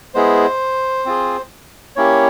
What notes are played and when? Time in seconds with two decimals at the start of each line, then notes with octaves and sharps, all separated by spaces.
0.14 G#3 B3 E4 G#4 C5
1.05 C4 F4 G#4
1.96 A#3 C#4 E4 G4 C#5